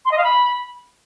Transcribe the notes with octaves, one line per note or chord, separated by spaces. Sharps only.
C6
D#5
F5
B5